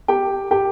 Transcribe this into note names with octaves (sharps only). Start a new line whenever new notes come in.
G4 G5
G4 G5